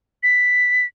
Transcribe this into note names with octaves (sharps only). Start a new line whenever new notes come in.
B6